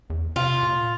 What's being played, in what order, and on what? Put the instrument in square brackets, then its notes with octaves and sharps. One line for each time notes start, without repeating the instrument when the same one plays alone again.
[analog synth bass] E2
[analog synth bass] C3 [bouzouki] F4
[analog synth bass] A#2